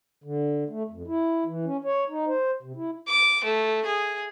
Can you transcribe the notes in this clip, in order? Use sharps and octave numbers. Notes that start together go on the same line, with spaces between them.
D3
A3
F2
E4
E3
C#4
C#5
D#4
C5
C3
E4
D6
A3
G#4